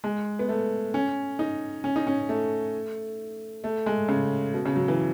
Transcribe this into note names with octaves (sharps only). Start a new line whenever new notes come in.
G#3
B3
A3
C#4
D#4
C#4
D#4
C#4
A3
A3
G#3
C#3
B2
C#3
F#3
E3